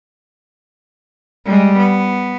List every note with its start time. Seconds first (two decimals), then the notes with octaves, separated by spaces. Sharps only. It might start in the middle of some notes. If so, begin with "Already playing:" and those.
1.45 G3 G#3
1.78 B3